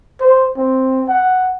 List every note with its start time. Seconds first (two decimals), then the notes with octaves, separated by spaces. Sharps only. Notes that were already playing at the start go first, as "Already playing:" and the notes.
0.20 C5
0.57 C4
1.08 F#5